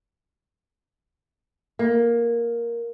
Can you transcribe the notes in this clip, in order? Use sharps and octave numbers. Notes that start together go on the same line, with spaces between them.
A#3